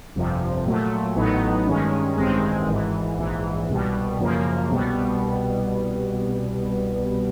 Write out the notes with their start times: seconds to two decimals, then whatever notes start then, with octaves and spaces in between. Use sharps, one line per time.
0.15 G1 F2 C3 F3
0.65 A#2 F#3 A3
1.16 A1 A2 F#3 B3 D#4
1.66 G2 D#3 G#3 C#4
2.17 A1 G2 D#3 G#3 C4
2.68 G#1 G#2 E3
3.18 A#1 G#2 E3
3.69 C2 B2 G3
4.19 F#2 C#3 F3 A#3
4.70 C2 B2 G3 B3